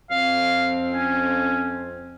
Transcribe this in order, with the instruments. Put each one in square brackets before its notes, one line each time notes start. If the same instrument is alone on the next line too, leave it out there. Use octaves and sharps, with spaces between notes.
[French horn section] F2 C4 [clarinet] F5
[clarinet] C#4